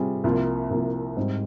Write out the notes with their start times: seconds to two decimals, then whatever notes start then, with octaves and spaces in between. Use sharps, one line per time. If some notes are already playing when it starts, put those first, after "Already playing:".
Already playing: C3 G3 C4 F4 G#4
0.24 C2 C3 F3 A#3 F4
0.70 C2 C3 F3 A#3 F4
1.16 G#2 G3 C4